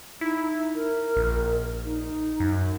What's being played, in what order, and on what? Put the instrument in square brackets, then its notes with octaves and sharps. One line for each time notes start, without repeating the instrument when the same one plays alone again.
[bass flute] D#4 [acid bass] E4
[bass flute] A#4
[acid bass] A#1
[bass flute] D#4
[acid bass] F#2